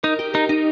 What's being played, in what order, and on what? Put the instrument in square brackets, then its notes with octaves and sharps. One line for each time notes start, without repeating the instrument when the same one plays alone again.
[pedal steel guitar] D#4 [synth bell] A#4
[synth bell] G4
[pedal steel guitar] D#4 [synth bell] A#4
[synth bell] D#4